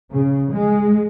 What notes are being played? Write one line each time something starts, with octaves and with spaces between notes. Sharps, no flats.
C#3
G#3